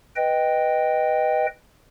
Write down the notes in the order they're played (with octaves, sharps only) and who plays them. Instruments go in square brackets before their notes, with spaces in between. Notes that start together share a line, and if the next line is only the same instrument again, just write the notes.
[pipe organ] B4 D#5 G5